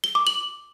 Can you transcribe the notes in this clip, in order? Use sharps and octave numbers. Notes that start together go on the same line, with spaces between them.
G7
D6
F#7